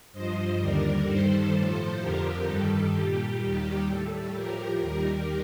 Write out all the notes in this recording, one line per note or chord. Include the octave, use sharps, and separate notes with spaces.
G2 F3 C5 D#5
D#2 D3 G3 A#4 D5
G2 D#3 G3 A4 C5
A2 F3
F2 D3 F3 G4 A#4
G2 D#3 G3 A4
A#2 G3 G4
D#2 D#3 G3 G4
A2 G3 A4
A2 F3 G4 A#4
D#2 D#3 G3